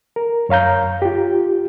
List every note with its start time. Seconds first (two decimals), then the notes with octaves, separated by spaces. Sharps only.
0.16 A#4
0.49 F#2 C#5 F5 A#5 G6
1.02 F4 G4